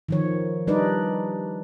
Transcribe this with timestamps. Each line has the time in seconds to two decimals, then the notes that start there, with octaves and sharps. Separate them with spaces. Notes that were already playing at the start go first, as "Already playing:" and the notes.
0.09 D#3 F3 C#5
0.67 G3 D4 D#4 B4 D5